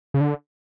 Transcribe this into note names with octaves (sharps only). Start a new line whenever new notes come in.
C#3
D3